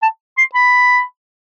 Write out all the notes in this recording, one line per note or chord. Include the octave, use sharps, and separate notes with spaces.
A5
C6
B5